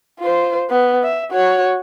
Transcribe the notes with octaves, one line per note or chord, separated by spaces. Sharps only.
F4 C5
B3
E5
F#4 C#5